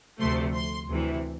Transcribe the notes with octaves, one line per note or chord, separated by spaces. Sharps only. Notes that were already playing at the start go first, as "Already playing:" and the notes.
D2 C3 F3 A3 C6
C6
D2 C3 E3